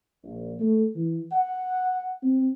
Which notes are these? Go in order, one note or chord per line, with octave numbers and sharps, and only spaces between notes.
A#1
A3
E3
F#5
C4